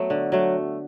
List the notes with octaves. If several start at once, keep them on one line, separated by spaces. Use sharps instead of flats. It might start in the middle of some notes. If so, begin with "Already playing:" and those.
Already playing: F#3 A3 B3
D3
F#3 A3